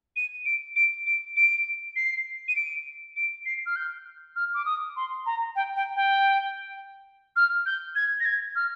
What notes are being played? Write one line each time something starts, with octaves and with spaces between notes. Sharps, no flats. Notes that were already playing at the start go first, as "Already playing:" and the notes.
D#7
D7
D7
D7
D7
C7
D#7
D7
D7
C7
F6
G6
F6
D6
D#6
C6
A#5
G5
G5
G5
F6
G6
G#6
A#6
G#6
F6